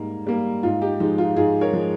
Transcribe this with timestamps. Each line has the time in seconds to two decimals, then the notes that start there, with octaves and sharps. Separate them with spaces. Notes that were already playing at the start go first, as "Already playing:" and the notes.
Already playing: G#2 G3 A#3
0.27 G3 A#3
0.63 G#2 F4
0.82 D#4 G4
1.00 F3 G#3 D#4
1.18 F4
1.36 G#2 F4 G#4
1.61 A#4 C#5
1.73 F3 G#3